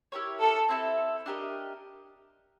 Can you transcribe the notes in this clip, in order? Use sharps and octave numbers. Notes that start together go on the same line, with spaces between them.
E4 G4 A#4 C#5
A4
C4 E4 A4
D4 G4 A#4 D#5